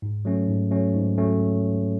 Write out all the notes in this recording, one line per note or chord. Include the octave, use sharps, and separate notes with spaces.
G#2
F#3 A3 C#4
G#2
F#3 A3 C#4
G#2
F#3 A3 C#4